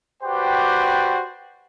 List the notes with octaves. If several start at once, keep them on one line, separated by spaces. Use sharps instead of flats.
F#4 G4 B4 C5 D5 G5